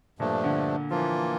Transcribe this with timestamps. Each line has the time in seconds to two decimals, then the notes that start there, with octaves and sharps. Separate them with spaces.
0.19 G2 A#2 F3 A3 D4
0.44 D3
0.90 E3 F3 A#3 F4